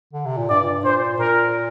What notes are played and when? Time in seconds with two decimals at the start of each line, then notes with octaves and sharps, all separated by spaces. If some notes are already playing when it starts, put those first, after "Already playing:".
0.13 D3
0.26 C3
0.37 A#2
0.49 G2 D5
0.84 A#2 C5
1.18 A#2 A#4